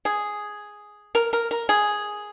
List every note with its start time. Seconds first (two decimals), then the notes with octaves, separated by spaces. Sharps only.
0.05 G#4
1.15 A#4
1.33 A#4
1.51 A#4
1.69 G#4